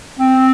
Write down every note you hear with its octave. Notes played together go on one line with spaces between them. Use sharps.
C4